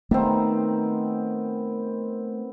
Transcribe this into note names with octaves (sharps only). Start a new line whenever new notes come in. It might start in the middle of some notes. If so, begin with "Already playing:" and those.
D#3 A3 B3 C4